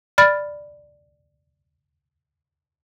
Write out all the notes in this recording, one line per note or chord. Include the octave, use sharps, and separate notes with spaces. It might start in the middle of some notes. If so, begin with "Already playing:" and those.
D5 B5 F6 A6